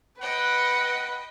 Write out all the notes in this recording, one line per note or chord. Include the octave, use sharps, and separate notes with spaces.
B4 D#5 F#5 G5